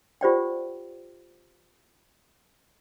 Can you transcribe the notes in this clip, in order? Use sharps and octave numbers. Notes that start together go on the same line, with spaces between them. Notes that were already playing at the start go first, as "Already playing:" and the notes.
F4 G4 C5 D5 F#5 G5